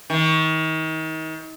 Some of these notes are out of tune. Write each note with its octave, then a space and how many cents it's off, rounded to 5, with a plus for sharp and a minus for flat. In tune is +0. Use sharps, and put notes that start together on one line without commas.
D#3 +35